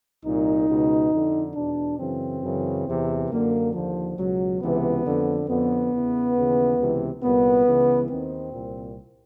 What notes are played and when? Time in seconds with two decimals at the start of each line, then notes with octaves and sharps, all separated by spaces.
0.25 C2 A#2 D#4
0.68 C#2 B2
1.12 F2 D3
1.55 E2 B2 D4
1.99 F#2 C#3 E3 C4
2.43 F#2 C#3 E3
2.87 E2 C3 E3
3.30 F#2 D3 A#3
3.73 D#2 D3 F3
4.17 C#2 B2 F#3
4.61 C#2 C3 E3 B3
5.05 F2 D3
5.48 F2 D3 B3
5.92 E2 C#3 E3
6.36 D#2 C#3 E3
6.79 C#2 C3 E3
7.24 C2 A#2 B3
7.66 C#2 C#3 E3
8.10 D#2 D#3 C4
8.53 C2 A#2